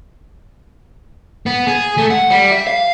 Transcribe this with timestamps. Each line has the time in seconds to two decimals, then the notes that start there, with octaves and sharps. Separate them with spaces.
1.46 B3
1.67 G#4
1.98 A3
2.10 F#5
2.30 G3
2.52 E5
2.67 F5